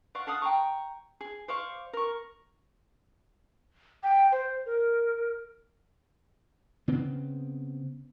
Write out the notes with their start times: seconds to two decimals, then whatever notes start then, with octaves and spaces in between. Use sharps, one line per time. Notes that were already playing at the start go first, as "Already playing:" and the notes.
0.15 D5 F5 F#5 C#6
0.27 A4 F5 F#5 D#6
0.42 G5 A#5 C#6
1.21 G#4
1.48 C5 D5 F5 C#6
1.93 A#4 C#6
4.03 G5
4.32 C5
4.66 A#4
6.88 C#3 B3 C4